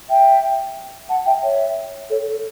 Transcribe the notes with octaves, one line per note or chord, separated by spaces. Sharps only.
E5 G5
F#5 A5
E5 G5
C#5 E5
A4 C#5
A4